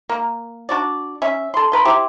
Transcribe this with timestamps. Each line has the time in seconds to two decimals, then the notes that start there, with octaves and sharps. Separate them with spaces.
0.09 A#3
0.69 D4 F#4 D5
1.22 C#4 E5
1.54 A4 C6
1.72 A#4 B4 C6
1.85 E4 G4 C5